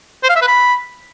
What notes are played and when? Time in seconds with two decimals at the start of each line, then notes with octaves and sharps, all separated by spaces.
0.23 C5
0.29 F5
0.35 E5
0.41 B4
0.47 B5